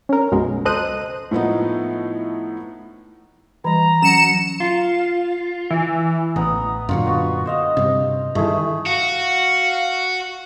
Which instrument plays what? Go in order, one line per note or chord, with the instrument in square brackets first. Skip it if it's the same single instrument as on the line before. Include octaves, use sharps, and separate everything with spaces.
[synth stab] C#4 A#4
B1 F#2 B2 G#3
C#2 A4 C5 D#5 F#6 D#7
[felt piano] A2 F3 B3 D#4
[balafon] E3 G3 [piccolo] A#5
[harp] F#3 [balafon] C#4 [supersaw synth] C#7 E7
[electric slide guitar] F4
[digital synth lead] E3
[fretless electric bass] A1 [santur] B3 A#5 D#6
[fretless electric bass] F#2 A#2 D3 [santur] F4 C#6
[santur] B3 F#4
C5 D#5 F5
[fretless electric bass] G2 C3
[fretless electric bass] G2 D#3 [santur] A3 E4 G#4
[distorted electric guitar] F#4 [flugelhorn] F5